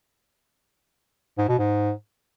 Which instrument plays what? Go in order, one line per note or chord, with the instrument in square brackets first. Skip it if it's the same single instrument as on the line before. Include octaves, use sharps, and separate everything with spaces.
[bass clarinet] G#2
B2
G#2